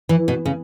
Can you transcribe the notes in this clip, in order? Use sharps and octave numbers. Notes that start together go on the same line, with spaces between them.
E3
B2
C#3